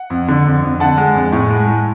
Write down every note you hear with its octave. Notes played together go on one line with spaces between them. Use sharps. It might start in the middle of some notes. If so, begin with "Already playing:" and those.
Already playing: F#5
F2
D3
F2
F2
D3 F#5 A5
G#3
F2
A2
G#3
G#3